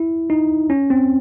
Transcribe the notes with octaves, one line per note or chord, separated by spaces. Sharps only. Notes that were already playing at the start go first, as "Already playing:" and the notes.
Already playing: E4
D#4
C#4
C4